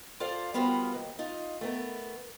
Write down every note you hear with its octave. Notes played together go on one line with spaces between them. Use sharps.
F4 A4 C5 D5 F5
G3 B3 F4 F#4 A#4 C5
D#2
D#4 F4
A3 B3 A#4